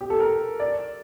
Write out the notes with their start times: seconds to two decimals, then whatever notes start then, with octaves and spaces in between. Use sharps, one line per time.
0.01 G4
0.10 A4
0.20 A#4
0.60 D5